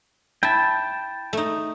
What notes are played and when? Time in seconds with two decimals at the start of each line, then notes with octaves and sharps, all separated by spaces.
0.43 E4 G5 A5
1.33 A3 D#4